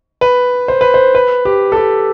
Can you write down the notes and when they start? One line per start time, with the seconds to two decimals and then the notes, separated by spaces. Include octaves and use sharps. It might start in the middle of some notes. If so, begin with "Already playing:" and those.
0.21 B4
0.68 C5
0.81 B4
0.94 C5
1.15 B4
1.45 G4
1.72 A4
1.77 G4